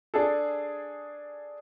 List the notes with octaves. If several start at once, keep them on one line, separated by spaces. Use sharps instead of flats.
D4 G#4 A4